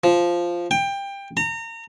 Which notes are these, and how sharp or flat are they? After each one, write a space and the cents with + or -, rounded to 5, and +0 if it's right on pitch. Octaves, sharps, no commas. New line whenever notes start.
F3 -5
G5 +20
A#5 -30